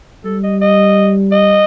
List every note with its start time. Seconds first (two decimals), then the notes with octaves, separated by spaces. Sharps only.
0.25 G3 A4
0.43 D#5
0.61 D#5
1.32 D#5